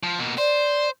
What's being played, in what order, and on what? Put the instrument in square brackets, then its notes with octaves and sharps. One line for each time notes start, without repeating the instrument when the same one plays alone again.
[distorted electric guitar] F3
B2 A#3
[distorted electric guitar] C5 [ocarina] D5